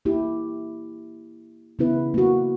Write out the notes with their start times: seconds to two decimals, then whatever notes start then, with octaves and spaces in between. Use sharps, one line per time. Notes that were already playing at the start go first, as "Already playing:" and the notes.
0.05 A#3 E4 G4
1.79 C#3 B3 E4 B4
2.14 A#3 F#4